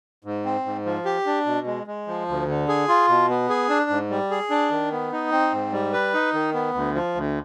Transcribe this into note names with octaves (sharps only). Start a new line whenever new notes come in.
G#2
C4
G#2
F3
G4
D4
B2
G#3
G#3
F3
D2
D3
G#4
F4
B2
B3
G#4
D4
G#2
G3
G#4
D4
D#3
B3
D#4
C4
G#2
G3
B4
D#4
D#3
B3
D2
F3
D2